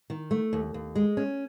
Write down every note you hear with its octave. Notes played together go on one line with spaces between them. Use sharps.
D#3
A3
D#2
D#2
G#3
C#4